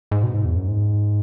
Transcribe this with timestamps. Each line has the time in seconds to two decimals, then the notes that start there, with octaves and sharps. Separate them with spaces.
0.11 G#2
0.23 B2
0.34 G#2
0.45 E2
0.56 F#2
0.68 G#2